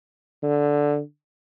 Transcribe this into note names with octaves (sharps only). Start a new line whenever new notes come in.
D3